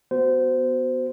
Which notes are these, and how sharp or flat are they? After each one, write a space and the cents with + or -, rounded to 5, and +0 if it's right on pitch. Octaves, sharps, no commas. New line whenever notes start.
B3 +10 F#4 +5 C5 -20